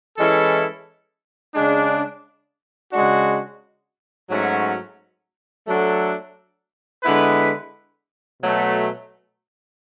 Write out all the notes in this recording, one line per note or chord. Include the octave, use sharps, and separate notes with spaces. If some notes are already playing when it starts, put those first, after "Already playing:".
E3 G#3 C#4 E4 A4
C#3 G#3 D4
C#3 G#3 D4 F#4
G#2 F#3 A3 C#4 F#4
F#3 A3 D4 F#4 A4
D3 G#3 B3 E4 B4
B2 F#3 A3